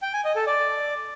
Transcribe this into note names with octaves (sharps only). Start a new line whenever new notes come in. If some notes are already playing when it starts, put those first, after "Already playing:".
G5
G#5
D#5
A4
D5